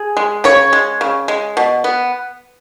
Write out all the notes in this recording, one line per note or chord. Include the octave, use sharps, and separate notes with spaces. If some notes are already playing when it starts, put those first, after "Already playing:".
Already playing: G#4
G#3
C#3 C#5
G#3
C#3
G#3
B2
B3